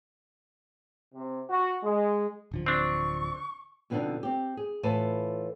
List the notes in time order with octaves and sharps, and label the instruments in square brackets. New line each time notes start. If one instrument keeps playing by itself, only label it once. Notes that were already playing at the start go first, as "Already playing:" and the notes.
[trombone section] C3
F#4
G#3
[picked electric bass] D1 D3 F3
[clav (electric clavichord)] C4 D4 [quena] C#6
[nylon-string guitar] F2 B2 D3 B3 D4 D#4
C4 G4
G#4
A2 E3 F4 B4 A5